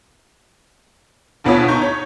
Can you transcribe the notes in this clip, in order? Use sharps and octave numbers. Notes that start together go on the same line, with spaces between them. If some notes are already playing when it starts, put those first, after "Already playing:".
D2 B2 B3 F4 C#5 D#6
D#4 C#6 G6
C#5